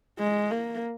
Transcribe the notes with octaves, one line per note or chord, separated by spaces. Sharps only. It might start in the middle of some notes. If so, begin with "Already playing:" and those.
G#3
A#3